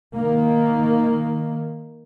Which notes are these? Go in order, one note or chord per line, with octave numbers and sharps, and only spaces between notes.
D#3 A#3